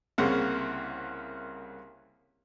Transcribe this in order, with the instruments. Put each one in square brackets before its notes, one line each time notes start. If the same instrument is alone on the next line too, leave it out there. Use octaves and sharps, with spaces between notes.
[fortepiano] C2 C#3 A#3 C4 C#4 F#5